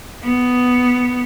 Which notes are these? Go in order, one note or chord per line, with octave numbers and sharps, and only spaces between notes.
B3